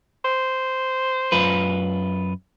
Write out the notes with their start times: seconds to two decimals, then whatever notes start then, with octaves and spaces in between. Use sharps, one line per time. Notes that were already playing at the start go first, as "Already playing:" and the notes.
0.25 C5
1.32 F#2 F4 B4